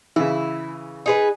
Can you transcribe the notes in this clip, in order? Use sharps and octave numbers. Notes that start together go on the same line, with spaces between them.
C#3 E3 E4
D#4 G#4 B4